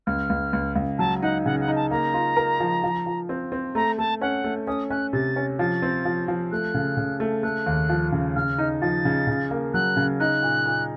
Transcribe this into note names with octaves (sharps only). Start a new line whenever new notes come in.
C#2 F6
C#2
C#2
C#2
F#3 A5
D#4 F#5
C#3 F#5
F#5
D#4
A5
A#3 A#5
F4
A#4
F3
F3
F3
C4
C4
A3 A#5
A3 A5
C#4 F#5
A3
C#4 D#6
C#4 F#6
C3 A6
C#4
F3 A6
C4
F3
F3
A3 F#6
C#3
C#3
A3
A3 F#6
D#2
F3
C#3
C#3 F6
D#4
F3 A6
C#3
C#3
A#3
F#3 F#6
C#3
D#4 F#6
A#2
A#2